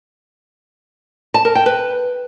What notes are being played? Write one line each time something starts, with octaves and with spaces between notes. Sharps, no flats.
A5
A#4
G5
B4